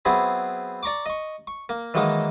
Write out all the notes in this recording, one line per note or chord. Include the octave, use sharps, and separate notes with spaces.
F#3 B3 C4 E4 G#4
D5 A#5 C#6 D6
D#5 C#6
C#6
A#3
D#3 E3 F#3 G#3 A#3 D#4